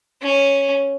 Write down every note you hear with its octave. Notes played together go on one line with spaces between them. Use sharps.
C#4